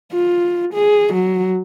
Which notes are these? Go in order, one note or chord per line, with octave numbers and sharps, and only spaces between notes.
F4
G#4
F#3